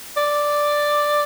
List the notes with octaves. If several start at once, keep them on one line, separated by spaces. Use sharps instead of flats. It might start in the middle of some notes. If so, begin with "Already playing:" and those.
D5